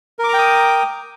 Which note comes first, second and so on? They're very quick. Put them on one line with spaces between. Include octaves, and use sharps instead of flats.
A#4 D6 A#5 G5 D#6